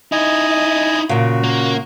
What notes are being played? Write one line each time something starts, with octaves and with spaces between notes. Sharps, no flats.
D#4 E4 D#5 G#5 D#6
A#2 C#3 F#4
A#3